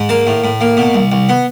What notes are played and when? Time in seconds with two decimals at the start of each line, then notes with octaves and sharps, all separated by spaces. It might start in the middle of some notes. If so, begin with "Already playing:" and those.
Already playing: G#2
0.09 A#3 A5
0.27 A2
0.44 A2
0.61 A#3
0.77 B2
0.94 C2
1.12 C2
1.29 B3